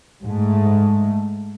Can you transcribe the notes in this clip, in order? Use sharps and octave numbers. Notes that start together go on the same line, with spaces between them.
G#2 A3